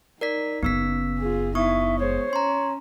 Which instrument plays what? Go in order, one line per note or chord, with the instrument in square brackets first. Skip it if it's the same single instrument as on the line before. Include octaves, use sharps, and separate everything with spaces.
[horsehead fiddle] D#4 [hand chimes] A#4 D5 B6
[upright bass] F#1 C#3 [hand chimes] B3 E6 B6
[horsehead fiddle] F4 G#4
[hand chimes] B3 C#6 D#6 [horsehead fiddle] D#4 E4 [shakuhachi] E5
[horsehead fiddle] G#3 C5 [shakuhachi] C#5
[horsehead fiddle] C#4 [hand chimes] A#5 C6